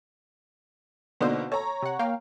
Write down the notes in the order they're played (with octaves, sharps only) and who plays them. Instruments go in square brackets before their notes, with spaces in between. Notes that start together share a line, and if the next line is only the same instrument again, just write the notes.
[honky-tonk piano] B2 D3 A#3 [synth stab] B3 D#4 C5
[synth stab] A4 [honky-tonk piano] C#5 A#5
[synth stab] C3 F#5
A#3 F5 G5